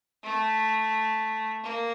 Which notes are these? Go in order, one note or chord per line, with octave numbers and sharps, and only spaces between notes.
A3
A#3